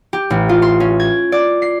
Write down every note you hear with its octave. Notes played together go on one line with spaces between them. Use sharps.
G4
A1
F4
C6
C#4
G#6
D5
C7